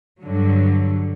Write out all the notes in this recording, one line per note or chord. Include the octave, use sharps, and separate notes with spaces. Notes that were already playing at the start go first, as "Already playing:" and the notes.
G2 D3 F#3